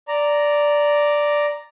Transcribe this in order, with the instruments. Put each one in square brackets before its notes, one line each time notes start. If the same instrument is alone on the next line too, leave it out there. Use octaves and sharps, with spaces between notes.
[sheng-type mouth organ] D5 A#5